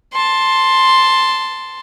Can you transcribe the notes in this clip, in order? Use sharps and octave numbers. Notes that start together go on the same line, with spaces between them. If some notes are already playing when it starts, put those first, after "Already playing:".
A5 C6